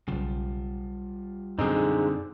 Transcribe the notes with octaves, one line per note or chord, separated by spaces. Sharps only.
B1 C#3 G3 F4
F#2 B2 D3 C4 D#4 G#4